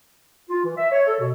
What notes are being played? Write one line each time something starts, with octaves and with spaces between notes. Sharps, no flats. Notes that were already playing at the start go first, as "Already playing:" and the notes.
F4
E3
E5
C#5
A4
B2